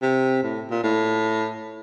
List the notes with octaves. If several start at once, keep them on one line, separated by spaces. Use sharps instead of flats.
C3
A2
A#2
A2